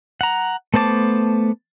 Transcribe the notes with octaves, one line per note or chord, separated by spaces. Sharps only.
F#5 A#5
A3 B3 C5 A5 D6